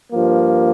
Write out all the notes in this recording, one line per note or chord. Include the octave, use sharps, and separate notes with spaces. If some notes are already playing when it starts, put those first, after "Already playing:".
G2 F3 A#3